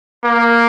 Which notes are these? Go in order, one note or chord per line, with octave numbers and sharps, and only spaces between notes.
A#3